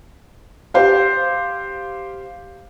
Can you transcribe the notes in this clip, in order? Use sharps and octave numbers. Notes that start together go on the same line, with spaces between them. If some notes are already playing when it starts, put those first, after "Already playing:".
G4 C5 F5